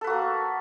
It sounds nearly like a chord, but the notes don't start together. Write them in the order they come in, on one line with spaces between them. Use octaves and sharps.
A4 B4 F#4 A#3